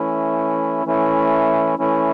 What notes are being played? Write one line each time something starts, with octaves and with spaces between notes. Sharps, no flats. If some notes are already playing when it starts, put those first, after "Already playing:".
Already playing: E3 A3 C#4 E4
E3 A3 C#4 E4
E3 A3 C#4 E4